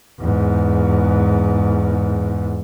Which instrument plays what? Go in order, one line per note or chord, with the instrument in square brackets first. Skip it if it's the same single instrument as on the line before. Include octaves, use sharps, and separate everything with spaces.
[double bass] E2 G#2